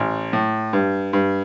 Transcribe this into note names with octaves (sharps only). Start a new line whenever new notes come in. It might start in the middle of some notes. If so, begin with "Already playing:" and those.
Already playing: A1
A2
G2
G2